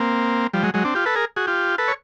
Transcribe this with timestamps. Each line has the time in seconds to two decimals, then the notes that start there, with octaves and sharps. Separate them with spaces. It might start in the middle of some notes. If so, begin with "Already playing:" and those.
Already playing: A#3 C4
0.53 F3 G3
0.63 F#3 G#3
0.74 F#3 G#3
0.85 C4 D4
0.95 F4 G4
1.05 A4 B4
1.16 G#4 A#4
1.36 F#4 G#4
1.47 F4 G4
1.78 A4 B4
1.88 C#5